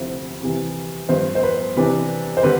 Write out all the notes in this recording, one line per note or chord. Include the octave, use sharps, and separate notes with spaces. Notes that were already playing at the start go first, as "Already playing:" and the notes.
Already playing: D2 C3 F3 C4 E4
C3 E3 G3
G2 F3 B3 C5
C5
B4
C3 E3 G3 D4 B4
C5
D3 G3 B4